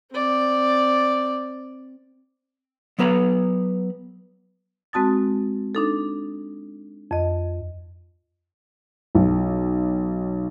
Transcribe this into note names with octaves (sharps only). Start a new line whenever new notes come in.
C4 D5
F#3 B3 B4 A#5
G#3 C4 F#4 A5 D#6 A6
D4 D#4 A4
F2 D#5
B1